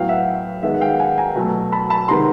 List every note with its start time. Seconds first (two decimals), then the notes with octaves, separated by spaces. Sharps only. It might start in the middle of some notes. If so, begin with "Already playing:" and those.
Already playing: A2 F#3 B3 F5 G5
0.09 E5 F#5
0.63 D#3 G#3 B3 E5 F#5
0.74 F#5
0.81 F5 G5
1.00 F#5 G#5
1.18 G#5 A#5
1.36 B2 F#3 A3
1.72 A5 B5
1.90 A5 B5
2.08 C3 D#3 G#3 B3 A#5 C6